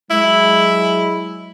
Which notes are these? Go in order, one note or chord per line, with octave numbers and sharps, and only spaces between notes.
F#3 G#3 E4